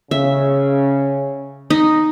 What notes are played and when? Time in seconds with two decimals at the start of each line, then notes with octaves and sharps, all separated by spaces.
0.11 C#3 E5
1.70 D#4